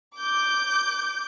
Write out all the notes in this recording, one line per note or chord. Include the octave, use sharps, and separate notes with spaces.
D6 G6